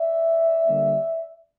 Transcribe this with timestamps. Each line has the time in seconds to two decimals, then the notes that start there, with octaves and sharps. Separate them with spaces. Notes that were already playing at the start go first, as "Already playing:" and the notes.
Already playing: D5 E5
0.67 D3 G3 A#3